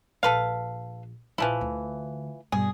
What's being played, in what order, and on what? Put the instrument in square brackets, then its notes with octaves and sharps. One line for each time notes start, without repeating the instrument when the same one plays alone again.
[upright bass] A#1 [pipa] A4 B4 F5
[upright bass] A#1 [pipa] E3 F3 E4
[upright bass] D2
[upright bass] G2 B2 [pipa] G#4